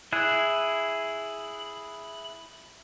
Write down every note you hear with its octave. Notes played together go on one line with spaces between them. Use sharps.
E4 G#4 F#6